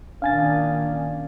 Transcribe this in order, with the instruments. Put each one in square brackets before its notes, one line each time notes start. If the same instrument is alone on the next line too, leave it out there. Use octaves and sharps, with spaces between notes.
[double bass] A#2 D#3 [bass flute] C#4 [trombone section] D4 [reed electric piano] F5 G#5 A6